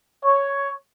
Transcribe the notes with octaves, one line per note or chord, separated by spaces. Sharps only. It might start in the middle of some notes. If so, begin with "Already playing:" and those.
C#5